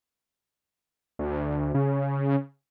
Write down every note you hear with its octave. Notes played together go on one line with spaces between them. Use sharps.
D2
C#3